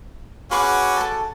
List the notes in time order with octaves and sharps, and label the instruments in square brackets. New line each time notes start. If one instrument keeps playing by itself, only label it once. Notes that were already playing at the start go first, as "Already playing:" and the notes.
[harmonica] C#4 F#4 D6 [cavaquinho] G#4 B4 C#6
[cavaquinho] A4 A5